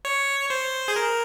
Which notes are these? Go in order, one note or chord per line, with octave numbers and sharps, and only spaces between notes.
C#5
C5
G#4
A#4